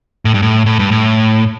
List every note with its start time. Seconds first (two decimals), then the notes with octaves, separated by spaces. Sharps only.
0.25 A2
0.34 G2
0.42 A2
0.66 A2
0.79 G2
0.91 A2